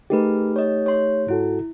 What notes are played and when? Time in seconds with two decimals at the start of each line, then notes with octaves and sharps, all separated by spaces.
0.10 A3 D#4 G4 G#4 A#4 B4
0.56 C#5 D#5
0.86 C#5 C6
1.28 G#2 E4 F#4 A4